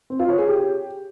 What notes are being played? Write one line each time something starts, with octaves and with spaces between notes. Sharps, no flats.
C4
F4
C#5
G#4
G4